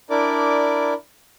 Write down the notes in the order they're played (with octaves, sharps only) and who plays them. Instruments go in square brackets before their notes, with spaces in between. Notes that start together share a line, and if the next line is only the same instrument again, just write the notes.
[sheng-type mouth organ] D4 E4 A#4 D5 D6